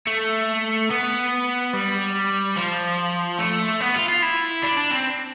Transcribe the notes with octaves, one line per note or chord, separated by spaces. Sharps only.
A3
B3
G3
F3
A3
B3
F4
F4
E4
D4
D4
C4